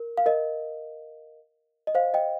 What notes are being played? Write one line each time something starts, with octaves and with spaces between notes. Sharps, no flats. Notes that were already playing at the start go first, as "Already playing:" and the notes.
Already playing: A#4
F5
A#4 D#5
D#5
C5 F5
D#5 G5